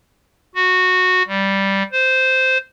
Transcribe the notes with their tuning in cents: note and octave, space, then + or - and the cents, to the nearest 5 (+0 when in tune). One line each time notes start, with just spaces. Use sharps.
F#4 -10
G3 -5
C5 -10